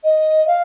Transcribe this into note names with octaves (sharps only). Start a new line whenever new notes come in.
D#5
F5